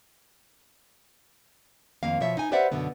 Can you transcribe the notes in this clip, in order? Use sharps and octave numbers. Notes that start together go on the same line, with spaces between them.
F2 D#3 A#3 F5
B2 F3 C#5 E5
D#4 G#5
G4 B4 C5 D5 E5 F#5
F#2 B2 D3 B3